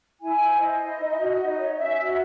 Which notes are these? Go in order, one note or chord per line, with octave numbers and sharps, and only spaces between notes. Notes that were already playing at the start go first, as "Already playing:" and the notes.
E4 G#5
C5
C5 D#5
E4
D#4
F#4
D#4
C#5
C#4 E5
F#4